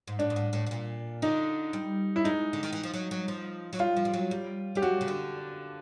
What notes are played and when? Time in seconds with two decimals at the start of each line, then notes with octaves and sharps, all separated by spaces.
0.08 G#2
0.19 A2 D4
0.30 G#2
0.36 A2
0.53 A2
0.66 B2
0.71 A#2
1.22 D3 D#4
1.73 G3
2.16 E4
2.24 G#3 D#4
2.53 D3
2.63 D#3
2.73 E3
2.83 F3
2.93 F#3
3.11 F#3
3.28 F3
3.73 F#3
3.79 G3 F4
3.96 F3
4.05 G3
4.13 F#3
4.31 G3
4.75 G3 G4
4.82 F#3 F#4
5.01 C#3
5.08 D3